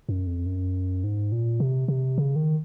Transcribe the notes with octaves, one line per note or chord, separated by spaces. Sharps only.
F#2
F2
F#2
G#2
A#2
C3
C3
C#3
D#3